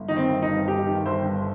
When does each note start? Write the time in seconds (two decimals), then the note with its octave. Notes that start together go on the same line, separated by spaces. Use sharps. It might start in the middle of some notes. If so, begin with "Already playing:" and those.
Already playing: G1
0.08 D#3 D#4
0.17 C4
0.29 G1
0.42 D#4
0.49 G2
0.68 G1 G4
0.87 D#3
1.06 G1 C5
1.25 G2